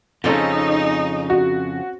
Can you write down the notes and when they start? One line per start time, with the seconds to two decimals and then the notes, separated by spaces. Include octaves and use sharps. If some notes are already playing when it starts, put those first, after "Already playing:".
0.24 F2 A2 C#3 C4 C#4 D#4 A4
1.30 F#4